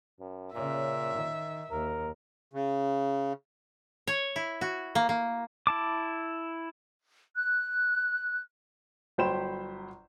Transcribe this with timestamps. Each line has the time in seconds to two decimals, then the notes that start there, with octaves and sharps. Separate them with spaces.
0.20 F#2
0.54 A#2 C#3 C#4 E5
1.14 D#3
1.71 D#2 A#4
2.53 C#3
4.07 C#5
4.36 E4
4.61 F#4
4.95 A#3
5.09 A#3
5.67 E4 A5 D6
7.36 F#6
9.18 G1 F#3 C5 G5 B5 E7